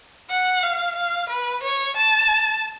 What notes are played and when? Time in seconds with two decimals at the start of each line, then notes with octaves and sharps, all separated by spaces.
0.30 F#5
0.63 F5
0.95 F5
1.29 B4
1.63 C#5
1.97 A5